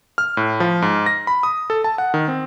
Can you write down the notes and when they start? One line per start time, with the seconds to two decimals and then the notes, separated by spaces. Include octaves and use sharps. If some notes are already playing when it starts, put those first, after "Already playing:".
0.18 F6
0.37 A2
0.60 F3
0.82 G#2
1.06 A#6
1.27 B5
1.43 D#6
1.70 A4
1.84 A5
1.98 F#5
2.14 D#3
2.28 C4